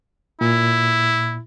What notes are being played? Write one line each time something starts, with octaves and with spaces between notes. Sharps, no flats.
A#2 E4